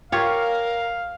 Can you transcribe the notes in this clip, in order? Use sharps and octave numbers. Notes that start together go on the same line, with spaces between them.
F4 G4 A#4 C#5 F5